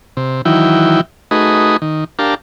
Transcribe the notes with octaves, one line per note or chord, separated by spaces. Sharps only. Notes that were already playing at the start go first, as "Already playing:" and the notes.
C3
D#3 E3 F#3 E4 G5
A3 D#4 F#4 G#4 B4 D#5
D#3
D4 G4 A#4 F5 A5